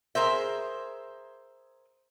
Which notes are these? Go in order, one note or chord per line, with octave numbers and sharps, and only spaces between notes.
G#4 A#4 C5 E5